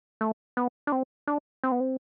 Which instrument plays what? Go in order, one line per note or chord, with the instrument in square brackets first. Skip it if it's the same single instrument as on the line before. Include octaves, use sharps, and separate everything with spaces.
[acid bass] A3
B3
D4
C4
D4
C4
B3
C4